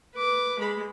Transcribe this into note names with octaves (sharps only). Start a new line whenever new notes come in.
B4 D6
G#3 B5